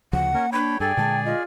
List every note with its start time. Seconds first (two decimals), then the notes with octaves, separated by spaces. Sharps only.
0.13 D2 C#3 F3 F#5
0.34 A#3 C#4 A#4
0.52 D4 C#5 G5 B5
0.80 G2 G#4 A4 D5 G5 G#5
0.97 A#2 D3 G#3 A5
1.24 F4 D#5